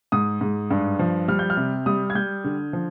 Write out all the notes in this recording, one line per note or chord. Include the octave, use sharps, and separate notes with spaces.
G#2 D#6
G#2
G2
F3
G3 F6
G6
F6
C3
G3 D#6
G#6
G3 G6
D3
F3